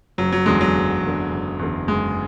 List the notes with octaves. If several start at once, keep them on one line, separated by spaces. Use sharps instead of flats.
F#1 F#3
F#3
E2 D3 G#3
F#3
F#1
E2 D3
F#1
E2 D3
F#1 G#3